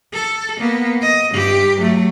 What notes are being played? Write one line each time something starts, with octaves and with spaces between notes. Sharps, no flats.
A4
A#3 B3
D#5
G2 G4
F#3 A3